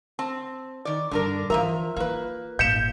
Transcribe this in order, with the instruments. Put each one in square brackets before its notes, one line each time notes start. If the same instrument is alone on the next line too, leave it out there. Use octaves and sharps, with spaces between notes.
[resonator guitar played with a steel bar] C4 [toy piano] A5
[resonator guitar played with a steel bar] D#3 D5
[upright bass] G2 [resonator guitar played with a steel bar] D3 D4 A#4
[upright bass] E3 [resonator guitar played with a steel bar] F3 E5 A#5 [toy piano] A#4
[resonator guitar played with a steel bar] A#3 B4 [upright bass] F4
[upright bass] G#1 A#2 [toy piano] F5 [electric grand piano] G6 C#7 E7